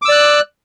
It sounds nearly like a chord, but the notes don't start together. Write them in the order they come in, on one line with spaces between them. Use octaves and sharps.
D6 E6 D5 F#6